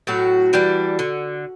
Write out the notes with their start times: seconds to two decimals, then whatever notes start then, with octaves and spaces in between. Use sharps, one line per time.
0.07 A2 F#3 F#4
0.53 E3 G3 D4
0.99 D3